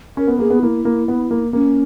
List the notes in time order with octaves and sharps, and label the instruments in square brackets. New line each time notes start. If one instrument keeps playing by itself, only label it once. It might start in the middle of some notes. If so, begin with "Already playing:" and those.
[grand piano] C#4 [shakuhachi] A#4
[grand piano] B3
[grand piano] A#3 [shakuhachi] G#4
[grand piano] B3
[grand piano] A#3 [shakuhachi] E4
[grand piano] A#3
B3
A#3
[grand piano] A#3 [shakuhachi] C#4